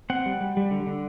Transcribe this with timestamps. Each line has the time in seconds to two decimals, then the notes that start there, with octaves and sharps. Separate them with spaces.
0.10 C4 F#5
0.26 G3
0.41 G3
0.57 G3
0.71 D3
0.87 D3